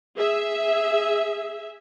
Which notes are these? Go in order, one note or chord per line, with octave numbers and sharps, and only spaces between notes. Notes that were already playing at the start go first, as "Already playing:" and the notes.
G#4 E5